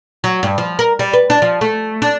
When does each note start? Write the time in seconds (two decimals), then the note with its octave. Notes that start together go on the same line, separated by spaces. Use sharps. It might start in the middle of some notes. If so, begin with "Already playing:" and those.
0.24 F#3
0.43 G2
0.58 F3
0.79 A#4
0.99 G3
1.13 B4
1.30 D4
1.42 F3
1.61 A3
2.02 D4